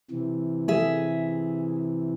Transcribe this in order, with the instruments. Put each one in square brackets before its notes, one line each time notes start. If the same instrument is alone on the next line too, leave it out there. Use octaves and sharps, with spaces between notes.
[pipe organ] C3 E3
[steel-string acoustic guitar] G#4 E5